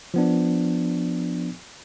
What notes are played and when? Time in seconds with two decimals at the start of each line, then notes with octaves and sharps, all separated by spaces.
0.14 F3 B3 D4